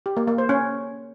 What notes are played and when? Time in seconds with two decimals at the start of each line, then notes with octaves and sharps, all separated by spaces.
0.06 G4
0.17 A#3
0.27 A#3
0.38 C5
0.49 C#4